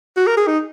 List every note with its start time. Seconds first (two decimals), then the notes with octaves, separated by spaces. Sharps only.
0.17 F#4
0.27 A#4
0.37 G#4
0.47 D#4